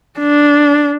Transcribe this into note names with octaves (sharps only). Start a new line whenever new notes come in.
D4